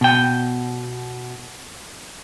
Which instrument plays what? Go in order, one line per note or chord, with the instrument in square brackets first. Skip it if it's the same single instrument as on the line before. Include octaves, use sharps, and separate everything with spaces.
[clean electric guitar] B2 G5